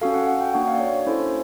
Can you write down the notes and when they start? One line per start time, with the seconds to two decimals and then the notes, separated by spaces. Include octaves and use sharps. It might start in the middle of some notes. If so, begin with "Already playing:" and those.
0.01 C#4 F#4 A4 F5
0.14 F#5
0.27 F#5
0.41 G5
0.53 A#3 D4 F#4 F#5
0.68 F5
0.75 D5
0.80 C#5
0.93 C#5
1.07 C#4 E4 A4 C5